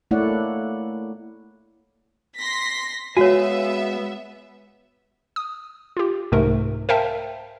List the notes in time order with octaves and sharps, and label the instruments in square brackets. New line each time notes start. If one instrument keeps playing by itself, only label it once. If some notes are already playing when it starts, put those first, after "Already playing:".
[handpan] A3 A#3 E4 C#5 D5 F#5
[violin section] C6 A#6 B6
[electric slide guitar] G#3 F5 G#5 [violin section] B3 E5 [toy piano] F#4 C#5
[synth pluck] D#6
F4 G4
C2 G#2 C3 A3 A#4
A#4 C5 E5 F5 G5 A5